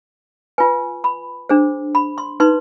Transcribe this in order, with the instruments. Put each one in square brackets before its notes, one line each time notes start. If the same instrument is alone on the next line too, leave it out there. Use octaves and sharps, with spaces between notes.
[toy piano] F4 B4 G#5
B5
D4 G#4 C5
B5
C6
D#4 B4 C6